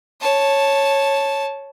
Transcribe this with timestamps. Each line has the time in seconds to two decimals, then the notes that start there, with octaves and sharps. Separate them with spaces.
0.21 C#5 A5